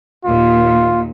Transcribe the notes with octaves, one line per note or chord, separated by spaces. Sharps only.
D#2 A#2 F4